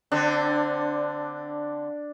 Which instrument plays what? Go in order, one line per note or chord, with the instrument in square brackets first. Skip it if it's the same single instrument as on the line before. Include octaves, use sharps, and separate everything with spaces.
[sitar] D3 C4 [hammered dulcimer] D4